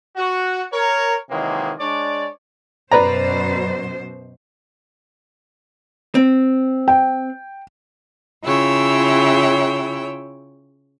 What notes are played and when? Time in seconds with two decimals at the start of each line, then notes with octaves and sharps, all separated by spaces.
0.16 F#4
0.73 A#4 C#5
1.30 C3 D#3 E3 F#3 G#3 A#3
1.79 G#3 D4 C#5 D5
2.92 F#2 B2 B4 C5 D5 A#5
6.15 C4
6.88 G5
8.45 C#3 E4 F4 C#5 G5 E6